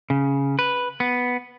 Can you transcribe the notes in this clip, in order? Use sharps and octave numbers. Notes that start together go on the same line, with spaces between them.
C#3
B4
B3